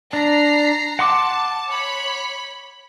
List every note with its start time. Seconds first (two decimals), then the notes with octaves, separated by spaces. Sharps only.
0.13 D4 A#5 C7
0.99 F#5 A5 C6 D6
1.71 C#5 B5